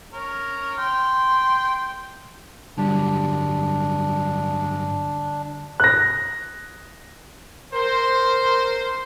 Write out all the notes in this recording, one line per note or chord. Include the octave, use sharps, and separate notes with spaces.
C#4 A#4
G5 C6
G2 D3 F#3 G3 D4
F#6 A#6
A#4 C5